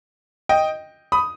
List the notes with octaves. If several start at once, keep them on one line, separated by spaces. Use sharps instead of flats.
D#5 G5
B5 D#6